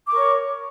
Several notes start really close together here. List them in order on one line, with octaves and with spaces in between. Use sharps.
D6 C#6 A#4 C#5